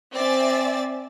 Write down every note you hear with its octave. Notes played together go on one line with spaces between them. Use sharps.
C4 D5 E5 G#5 A6